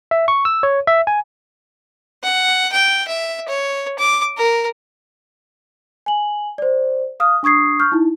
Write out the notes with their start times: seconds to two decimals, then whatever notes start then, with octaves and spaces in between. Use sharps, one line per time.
0.11 E5
0.28 C#6
0.45 E6
0.63 C#5
0.87 E5
1.07 G#5
2.23 F#5
2.72 G5
3.08 E5
3.48 C#5
3.98 D6
4.38 A#4
6.06 G#5 F#7
6.58 C5 D5
7.20 F5 D#6 F6
7.43 D4 C#6 D#6 G#6 C7
7.80 C#6 F6 G6
7.92 D#4 E4